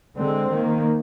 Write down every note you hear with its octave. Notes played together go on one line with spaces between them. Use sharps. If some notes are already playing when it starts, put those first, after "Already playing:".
D3 G#3 C4
D#3 A#3